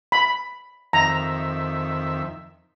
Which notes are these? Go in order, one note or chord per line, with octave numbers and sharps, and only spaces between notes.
B5
F2 D#3 E5 A#5